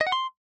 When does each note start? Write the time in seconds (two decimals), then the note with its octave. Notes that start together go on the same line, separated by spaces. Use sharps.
0.01 D#5
0.07 F#5
0.12 C6